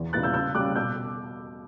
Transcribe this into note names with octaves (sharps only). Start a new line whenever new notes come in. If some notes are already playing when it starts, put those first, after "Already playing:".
Already playing: E2
C#3 G3 B3 E4 F#6 A6
E6 G6
C#3 E6 G6
G3 C#4 D6 F#6
B2 E6 G6